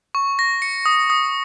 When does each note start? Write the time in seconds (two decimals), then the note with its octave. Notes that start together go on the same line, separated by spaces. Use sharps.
0.15 C#6
0.39 A#6
0.62 C#7
0.86 D#6
1.10 D#6